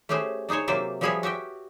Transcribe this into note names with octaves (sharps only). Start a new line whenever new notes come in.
A3 C#4 G4 G#4 C5
D4 D#4 G#4 C5 C#5
C3 F#3 A#3 C5 D5 E5
F3 G3 B3 G#4 C#5 E5
F#4 G4 E5 G5